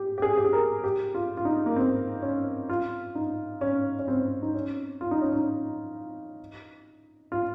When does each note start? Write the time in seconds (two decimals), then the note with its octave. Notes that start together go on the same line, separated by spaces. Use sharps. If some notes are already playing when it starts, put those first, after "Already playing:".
Already playing: G4
0.18 G4
0.22 G#4
0.37 G4
0.45 G#4
0.53 A#4
0.84 G4
1.15 F4
1.37 F4
1.45 D#4
1.66 A#3
1.76 C4
2.22 C#4
2.69 F4
3.15 D#4
3.61 C#4
3.99 C#4
4.08 C4
4.42 D#4
4.55 C#4
5.01 F4
5.11 D#4
5.22 C#4
5.33 D#4
7.32 F4